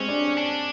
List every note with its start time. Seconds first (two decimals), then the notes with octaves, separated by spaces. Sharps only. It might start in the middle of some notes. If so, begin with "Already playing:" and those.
Already playing: G#3 C4 C#4
0.08 D4
0.37 D4